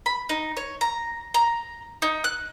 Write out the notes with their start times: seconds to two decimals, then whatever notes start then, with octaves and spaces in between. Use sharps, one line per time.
0.06 B5
0.29 D#4
0.57 C#5
0.81 A#5
1.34 A#5
2.02 D#4
2.24 F#6